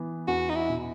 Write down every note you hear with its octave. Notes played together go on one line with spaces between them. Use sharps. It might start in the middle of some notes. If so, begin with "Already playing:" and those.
Already playing: E3 B3
E2 F#4
D#4
E4
B2